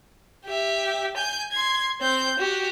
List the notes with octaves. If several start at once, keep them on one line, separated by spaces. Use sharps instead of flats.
G4 E5
G#5 G6
C6 G#6
C4 G6
F#4 G4